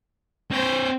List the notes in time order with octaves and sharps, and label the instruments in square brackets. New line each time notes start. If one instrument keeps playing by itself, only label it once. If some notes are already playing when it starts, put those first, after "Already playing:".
[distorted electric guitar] C4 C#5 [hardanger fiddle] C5 G5